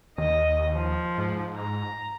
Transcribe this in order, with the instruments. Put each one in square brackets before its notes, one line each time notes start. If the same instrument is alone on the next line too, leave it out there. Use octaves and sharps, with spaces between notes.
[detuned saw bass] D#2 [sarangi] D#5
[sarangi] F3
[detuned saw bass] G#2
[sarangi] A#5